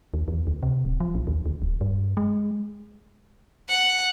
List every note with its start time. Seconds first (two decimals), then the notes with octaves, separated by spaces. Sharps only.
0.14 D#2
0.28 E2
0.47 D2
0.63 C3
0.85 D1
1.00 F3
1.15 A#1
1.27 D#2
1.46 D2
1.62 D1
1.81 G2
2.17 G#3
3.69 F#5